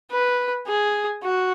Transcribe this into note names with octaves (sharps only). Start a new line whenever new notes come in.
B4
G#4
F#4